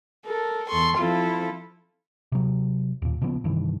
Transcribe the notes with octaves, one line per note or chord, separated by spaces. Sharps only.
A4 A#4
E2 A4 C6 C#6
F3 C4 E4 F4 A4
C3 F#3
D#2 A#2
A#2 C#3 F3 B3
G2 C3 D#3 E3